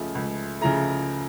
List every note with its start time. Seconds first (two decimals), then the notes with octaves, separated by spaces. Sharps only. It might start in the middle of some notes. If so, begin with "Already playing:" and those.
Already playing: C#2 C#3 F3 A3
0.15 C#2
0.61 C#3 F3 A3 A#5